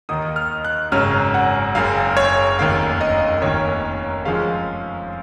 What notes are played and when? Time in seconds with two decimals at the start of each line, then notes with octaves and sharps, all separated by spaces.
0.09 D#2 D#3 A#3 D#4 D#6
0.36 F6
0.65 F#6
0.92 G#1 F#2 C#3 F#3 C#4 F6
1.34 F#5
1.75 F#1 F#2 C#3 F5
2.17 C#5
2.59 F1 D#2 D#3 A#3 F5
3.01 D#5
3.42 F1 D#2 D#3 A#3 C#4 C#5
4.25 F#2 F3 G#3 C#4 F5